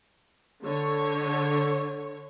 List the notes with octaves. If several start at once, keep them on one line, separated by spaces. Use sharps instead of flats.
D3 C#5